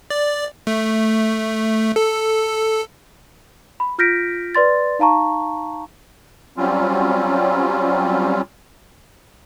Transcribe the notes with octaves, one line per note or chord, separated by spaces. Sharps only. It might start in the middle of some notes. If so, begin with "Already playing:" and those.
D5
A3
A4
B5
F4 F6 G6 A#6 B6 D7
B4 D5 C6 A6
D#4 F5 A5 A#5 C#6
F#3 G3 C4 C#4 F4